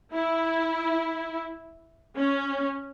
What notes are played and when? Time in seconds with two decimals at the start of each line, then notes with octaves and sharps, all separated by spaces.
0.13 E4
2.15 C#4